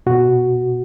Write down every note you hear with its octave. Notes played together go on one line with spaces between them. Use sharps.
B2 F#4